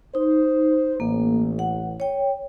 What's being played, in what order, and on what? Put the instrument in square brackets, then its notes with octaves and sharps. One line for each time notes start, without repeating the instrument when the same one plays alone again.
[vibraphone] D#4 [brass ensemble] C5
[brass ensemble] A1 [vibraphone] A#3
[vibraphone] F#5
C#5 G5